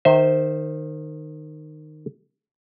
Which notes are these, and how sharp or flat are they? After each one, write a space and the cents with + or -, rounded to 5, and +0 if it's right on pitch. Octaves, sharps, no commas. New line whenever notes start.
D#3 -20 C5 +0 E5 -25